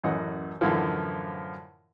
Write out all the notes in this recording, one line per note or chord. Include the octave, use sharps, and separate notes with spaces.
A1 F#2 E3 D#5 F#5
F#2 A2 D3 E3 F3